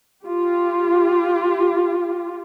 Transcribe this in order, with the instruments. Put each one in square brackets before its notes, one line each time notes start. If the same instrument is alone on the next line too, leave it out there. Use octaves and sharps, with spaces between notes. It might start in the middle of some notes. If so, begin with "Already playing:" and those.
[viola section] F4 G4